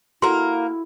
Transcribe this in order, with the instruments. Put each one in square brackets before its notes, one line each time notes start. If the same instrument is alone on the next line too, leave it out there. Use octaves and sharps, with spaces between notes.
[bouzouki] A#3 A#4 [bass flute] E4 [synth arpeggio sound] F#4 A4 F#5 [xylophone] C6